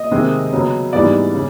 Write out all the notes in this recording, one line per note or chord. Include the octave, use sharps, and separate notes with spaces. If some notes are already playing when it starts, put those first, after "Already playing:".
Already playing: D#5
C3 D#3 G#3 C4
C#3 F#3 B3
G#2 E3 G3 B3 D#4 D5
C#3